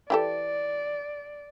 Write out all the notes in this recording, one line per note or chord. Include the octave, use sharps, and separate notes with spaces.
E3 G4 A4 D5